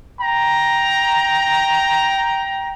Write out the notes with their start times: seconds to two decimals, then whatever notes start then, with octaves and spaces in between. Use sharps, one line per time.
0.21 G5 A#5